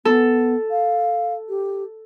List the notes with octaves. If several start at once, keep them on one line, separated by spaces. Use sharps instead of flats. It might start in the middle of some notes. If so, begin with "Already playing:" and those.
B3 A4
F5
G4